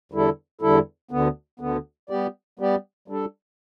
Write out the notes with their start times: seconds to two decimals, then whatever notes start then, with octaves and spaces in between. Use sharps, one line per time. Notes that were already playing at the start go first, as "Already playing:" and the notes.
0.12 E2 D3 G3 E4 A4
0.61 E2 D3 G3 E4 A4
1.11 D2 D3 B3
1.60 D2 D3 B3
2.09 G3 B3 G4 D5
2.59 G3 B3 G4 D5
3.08 G3 D4 A4